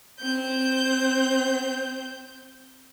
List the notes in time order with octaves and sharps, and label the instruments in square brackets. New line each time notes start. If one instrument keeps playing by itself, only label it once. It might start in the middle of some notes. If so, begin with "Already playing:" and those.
[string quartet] C4 G6